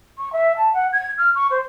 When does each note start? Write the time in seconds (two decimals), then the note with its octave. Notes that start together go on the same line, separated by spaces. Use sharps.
0.18 C#6
0.32 E5
0.56 A5
0.73 F#5
0.92 G#6
1.17 F6
1.34 C#6
1.50 C5